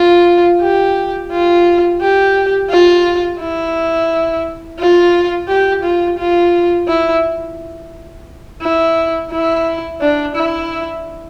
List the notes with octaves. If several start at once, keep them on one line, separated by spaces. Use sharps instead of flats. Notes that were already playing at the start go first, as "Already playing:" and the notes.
Already playing: F4
G4
F4
G4
F4
E4
F4
G4
F4
F4
E4
E4
E4
D4
E4